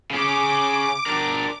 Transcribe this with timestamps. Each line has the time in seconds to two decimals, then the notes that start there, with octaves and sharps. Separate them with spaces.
0.11 C#3 C#4 D6
1.06 D4 A#4